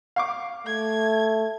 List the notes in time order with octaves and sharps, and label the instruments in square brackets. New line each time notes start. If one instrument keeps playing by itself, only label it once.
[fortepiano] F5 C#6 D6
[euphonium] A3 [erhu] G#6